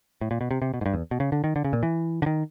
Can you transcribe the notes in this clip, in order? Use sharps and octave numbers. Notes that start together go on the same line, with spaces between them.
A2
A#2
B2
C3
C3
B2
G#2
G2
E2
B2
C#3
D3
D#3
D3
C#3
A#2
E3
D3
D#3